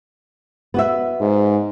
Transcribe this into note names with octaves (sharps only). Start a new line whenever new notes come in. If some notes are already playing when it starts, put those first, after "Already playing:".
B3 F#4 E5
G#2